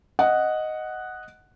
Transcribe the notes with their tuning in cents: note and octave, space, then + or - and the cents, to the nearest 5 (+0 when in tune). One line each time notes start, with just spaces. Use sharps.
D#5 +0 F#5 +0